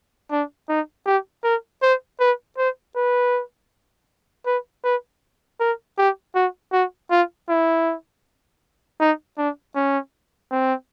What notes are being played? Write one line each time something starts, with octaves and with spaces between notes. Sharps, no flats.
D4
D#4
G4
A#4
C5
B4
C5
B4
B4
B4
A#4
G4
F#4
F#4
F4
E4
D#4
D4
C#4
C4